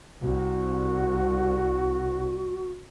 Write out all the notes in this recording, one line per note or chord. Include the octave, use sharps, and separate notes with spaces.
C2 F#4